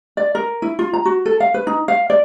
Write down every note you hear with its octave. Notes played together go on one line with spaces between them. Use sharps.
D5
A#4
E4
F4
A#5
F#4
A4
F5
B4
D#4
F5
D5